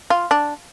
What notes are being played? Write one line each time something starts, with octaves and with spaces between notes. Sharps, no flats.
F4
D4